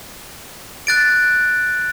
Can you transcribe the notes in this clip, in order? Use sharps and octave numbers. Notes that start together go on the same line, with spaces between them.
F#6 A6 D7